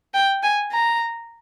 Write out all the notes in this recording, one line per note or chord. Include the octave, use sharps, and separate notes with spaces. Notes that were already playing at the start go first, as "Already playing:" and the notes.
G5
G#5
A#5